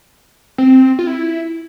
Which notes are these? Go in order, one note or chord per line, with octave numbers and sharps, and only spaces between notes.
C4
F4
E4